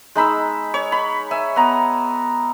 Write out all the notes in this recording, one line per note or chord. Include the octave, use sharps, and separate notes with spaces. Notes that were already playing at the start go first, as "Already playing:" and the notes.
G#3 D#4 B5 E6
C#5
B5
E5 G#5
B3 A#5